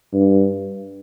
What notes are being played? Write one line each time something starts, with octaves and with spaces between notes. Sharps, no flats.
G2